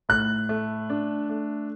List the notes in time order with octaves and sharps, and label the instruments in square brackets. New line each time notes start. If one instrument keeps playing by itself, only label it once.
[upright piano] A2 [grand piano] F#6
[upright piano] A3
D4
A3